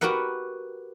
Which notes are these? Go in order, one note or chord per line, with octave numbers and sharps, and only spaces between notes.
F#4 G4 A#4 B4 F#5